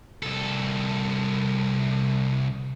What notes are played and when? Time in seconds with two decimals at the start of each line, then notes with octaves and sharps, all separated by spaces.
0.23 C2 A4